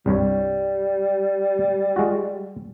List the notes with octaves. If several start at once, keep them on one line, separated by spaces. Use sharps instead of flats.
C2 G2 G3 C#5
G#3 F4 F#4